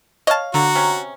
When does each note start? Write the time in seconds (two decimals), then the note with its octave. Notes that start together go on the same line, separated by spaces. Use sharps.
0.27 C#5 D#5 F5 A5
0.54 D3 F#4 A#5
0.75 C3 C#4